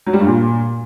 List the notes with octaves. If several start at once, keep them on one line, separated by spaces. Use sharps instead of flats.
F#3
G3
G2
A#2